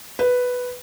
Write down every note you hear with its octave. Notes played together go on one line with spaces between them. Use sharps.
B4